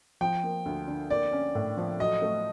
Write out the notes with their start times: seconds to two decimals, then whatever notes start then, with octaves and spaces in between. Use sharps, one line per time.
0.21 F3 G5
0.43 A#3
0.65 D2
0.88 D3
1.10 A#3 D5
1.33 C#4
1.55 A2
1.77 F3
1.99 F#3 D#5
2.22 A3